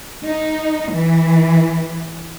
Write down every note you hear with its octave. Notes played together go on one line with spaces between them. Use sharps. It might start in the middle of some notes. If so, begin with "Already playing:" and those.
D#4
E3